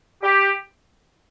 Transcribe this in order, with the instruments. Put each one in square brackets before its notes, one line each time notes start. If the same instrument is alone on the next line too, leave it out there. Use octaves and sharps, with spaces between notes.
[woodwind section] G4